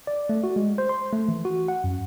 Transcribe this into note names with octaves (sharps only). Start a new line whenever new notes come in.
D5
A3
F#4
G#3
C5
C6
A3
E3
F#4
F#5
F#2